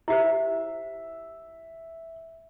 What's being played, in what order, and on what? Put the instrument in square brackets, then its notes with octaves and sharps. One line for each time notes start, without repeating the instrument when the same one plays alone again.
[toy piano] E4 G4 C5 [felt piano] E5